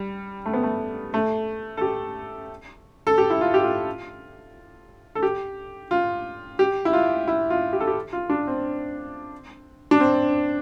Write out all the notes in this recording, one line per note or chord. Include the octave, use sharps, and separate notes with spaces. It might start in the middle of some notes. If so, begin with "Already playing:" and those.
Already playing: G3
A3
B3
A3
A3
A4
G4
A4
G4
E4
F4
G4
F4
A4
G4
F4
G4
E4
F4
E4
F4
G4
A4
G4
F4
D4
C4
D4
C4